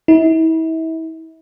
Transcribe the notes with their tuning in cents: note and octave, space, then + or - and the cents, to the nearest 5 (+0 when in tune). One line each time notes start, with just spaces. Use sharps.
E4 -35